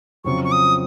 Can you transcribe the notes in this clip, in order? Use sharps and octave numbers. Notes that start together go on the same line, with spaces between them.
F2 C#3 F#3 C4 F4 C#6
C#6
D#6